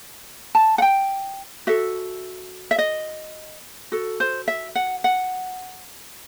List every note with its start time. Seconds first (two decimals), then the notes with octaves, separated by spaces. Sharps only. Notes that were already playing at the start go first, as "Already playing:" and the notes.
0.55 A5
0.78 F#5
0.82 G5
1.67 F#4 A4 E5
2.71 E5
2.78 D#5
3.92 F#4 A4
4.20 C5
4.48 E5
4.75 F#5
5.04 F#5